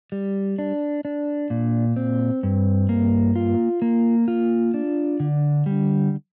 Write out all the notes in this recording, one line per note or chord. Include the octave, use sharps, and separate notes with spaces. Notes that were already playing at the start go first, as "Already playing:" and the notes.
G3
D4
D4
A#2
C4
G2
A#3
F4
A#3
F4
D4
D3
G3